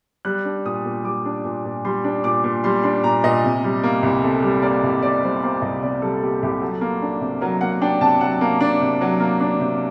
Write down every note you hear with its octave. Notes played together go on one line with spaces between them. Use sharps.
G3 F#6
D4
A#2 D#6
A#2
G3 D6
D4
A#2
A#2
G3 C6
D4
A#2 D6
A#2
G3 C6
D4 C6
A#2 A#5
A#2 D#5
C3
G3
A#3
C2
C3 A4
G3
A#3 D5
C2
C3 D5
G3 C5
A#3 C5
C2 D#5
C3 D5
G3 A4
A#3 G4
C2 G4
F#3 A4
A#3
D4
C3
F#3 A#4
A#3 F#5
D4 G5
C3 A5
F#3 F#5
A#3
D4
C3
F#3
A#3
D4
C3